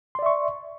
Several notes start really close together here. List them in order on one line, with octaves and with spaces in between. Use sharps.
C6 D5 E5 C#6